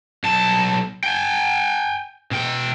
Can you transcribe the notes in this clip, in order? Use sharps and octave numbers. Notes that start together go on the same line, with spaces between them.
B1 A5
G5 G#5
B2 G5